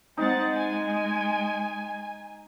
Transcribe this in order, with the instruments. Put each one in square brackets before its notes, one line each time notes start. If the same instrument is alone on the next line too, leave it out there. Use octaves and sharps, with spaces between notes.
[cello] G#3 [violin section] C4 F#5 A6 [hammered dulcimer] D#4
[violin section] G#5